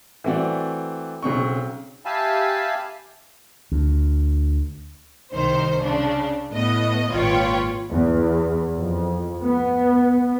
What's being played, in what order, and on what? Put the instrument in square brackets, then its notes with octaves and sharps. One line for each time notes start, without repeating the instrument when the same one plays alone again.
[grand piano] E3 A3 C4 F#4 D5
B1 C#3 C4 C#6
[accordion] G4 E5 F5 G#5 A5 B5
[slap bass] D2
[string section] C2 D#3 C5
C#3 D4
A2 B3 D#5
G#1 A#2 F4 B4 C#5 G5
[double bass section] E2
F2
B3